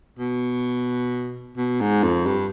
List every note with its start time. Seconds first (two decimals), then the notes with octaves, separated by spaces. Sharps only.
0.19 B2
1.57 B2
1.81 G#2
2.03 F2
2.26 G2